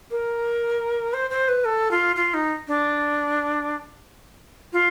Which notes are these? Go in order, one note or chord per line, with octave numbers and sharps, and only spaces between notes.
A#4
C5
C5
B4
A4
F4
F4
D#4
D4
F4